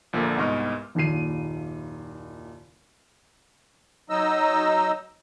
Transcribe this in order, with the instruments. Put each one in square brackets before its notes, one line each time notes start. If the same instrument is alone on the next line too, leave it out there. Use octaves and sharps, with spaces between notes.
[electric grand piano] A#1 A#2 D3 F3 A#3
C2 G#2 B3 D#5 C#6 F6
[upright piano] F#1 D#2 A#2 G#4 C7 D#7
[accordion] F#3 D#4 D#5 E6